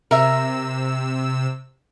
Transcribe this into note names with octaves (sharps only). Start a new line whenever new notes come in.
C3 A#4 E5 E6